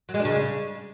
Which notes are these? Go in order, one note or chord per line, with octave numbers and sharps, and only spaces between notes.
F#3
G#3
D4
C#3